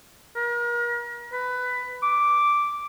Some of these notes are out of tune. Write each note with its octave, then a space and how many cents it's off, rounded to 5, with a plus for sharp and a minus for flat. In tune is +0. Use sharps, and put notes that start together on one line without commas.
A#4 +40
B4 +15
D6 +0